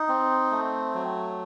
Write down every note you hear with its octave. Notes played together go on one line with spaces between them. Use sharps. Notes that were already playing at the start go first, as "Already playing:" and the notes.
Already playing: D#4
C4
A3
F#3